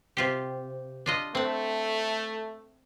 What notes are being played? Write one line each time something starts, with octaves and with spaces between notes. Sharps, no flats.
C3 F4 G4
D4 F4 D#5
A3 C4 F#5